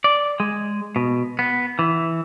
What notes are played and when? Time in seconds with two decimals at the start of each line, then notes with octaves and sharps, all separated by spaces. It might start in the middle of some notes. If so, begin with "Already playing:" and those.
0.04 D5
0.40 G#3
0.96 B2
1.39 B3
1.79 E3